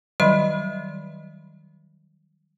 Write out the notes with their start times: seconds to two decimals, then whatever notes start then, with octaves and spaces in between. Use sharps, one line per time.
0.20 D#3 F#3 G3 D#5 B5 C6